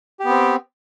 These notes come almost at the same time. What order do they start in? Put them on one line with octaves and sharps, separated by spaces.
G4 B3 C4